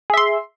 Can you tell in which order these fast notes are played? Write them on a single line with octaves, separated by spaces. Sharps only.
G#4 E5 C6